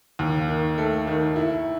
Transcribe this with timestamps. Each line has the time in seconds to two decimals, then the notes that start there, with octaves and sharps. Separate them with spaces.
0.19 D#2
0.49 D#3
0.78 A3
1.07 D#3
1.36 E4